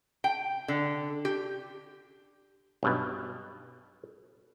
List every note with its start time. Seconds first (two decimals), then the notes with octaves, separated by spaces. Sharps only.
0.24 G5
0.68 D3
1.25 G4
2.83 B1 G2 B2